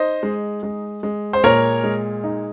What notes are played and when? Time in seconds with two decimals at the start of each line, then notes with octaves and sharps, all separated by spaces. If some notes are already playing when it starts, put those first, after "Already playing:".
Already playing: D#4 C5 D#5
0.23 G#3
0.63 G#3
1.03 G#3
1.33 C5
1.43 A#2 A#4 C#5
1.84 G#3
2.24 D#4